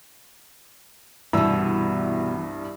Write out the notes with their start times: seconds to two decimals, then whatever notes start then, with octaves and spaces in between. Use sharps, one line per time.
1.33 C2 G2 B2 E3 E6